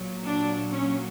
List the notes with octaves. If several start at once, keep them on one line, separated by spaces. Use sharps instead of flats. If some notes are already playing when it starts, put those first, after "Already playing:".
Already playing: A#2 F#3
D4
C#4